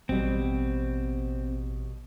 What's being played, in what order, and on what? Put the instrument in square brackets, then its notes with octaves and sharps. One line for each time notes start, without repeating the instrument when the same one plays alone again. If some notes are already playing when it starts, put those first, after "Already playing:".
[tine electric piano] A1 [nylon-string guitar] B2 G3 [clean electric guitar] C4